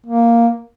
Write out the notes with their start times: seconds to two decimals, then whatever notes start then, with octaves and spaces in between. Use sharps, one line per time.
0.06 A#3